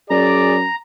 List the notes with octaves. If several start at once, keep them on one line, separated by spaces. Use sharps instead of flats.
F#2 G#4 D5 A#5